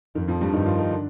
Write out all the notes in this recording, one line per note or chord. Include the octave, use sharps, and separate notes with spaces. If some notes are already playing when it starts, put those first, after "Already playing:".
F2 D#3
F2 F3
G2 G3
G2 D#3 D#4
F3 F4
D#3 D#4
D3 D4